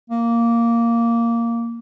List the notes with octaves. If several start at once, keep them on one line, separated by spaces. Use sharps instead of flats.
A#3